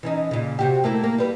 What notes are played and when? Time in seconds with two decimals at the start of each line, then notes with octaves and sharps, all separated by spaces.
0.03 E3 C#4 D#4
0.31 A#2 C#3
0.59 C3 F#4 G4
0.84 A3 A#3 E4
1.04 A#3
1.18 G3 B4